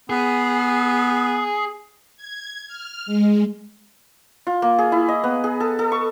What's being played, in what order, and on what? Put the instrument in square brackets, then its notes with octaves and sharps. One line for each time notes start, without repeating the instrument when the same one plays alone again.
[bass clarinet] B3 [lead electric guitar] G#4
[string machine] G#6
F6
G#3
[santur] F4
A#3
G#4
E4
D#5
B3
G#4
A4
A4
C#6